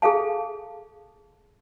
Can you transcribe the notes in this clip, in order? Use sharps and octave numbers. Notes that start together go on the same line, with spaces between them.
G#4 A4 F5 A5